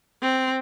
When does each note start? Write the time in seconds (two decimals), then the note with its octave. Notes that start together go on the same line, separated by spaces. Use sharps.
0.22 C4